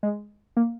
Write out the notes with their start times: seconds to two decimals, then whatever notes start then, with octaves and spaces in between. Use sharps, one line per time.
0.03 G#3
0.57 A#3